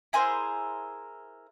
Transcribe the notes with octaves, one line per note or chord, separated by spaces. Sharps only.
E4 G#4 A#4 C5